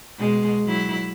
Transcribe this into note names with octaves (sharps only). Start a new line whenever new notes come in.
B2 G#3
F#3 E4